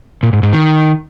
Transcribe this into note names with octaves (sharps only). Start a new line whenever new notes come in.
A#2
G#2
G#2
D#3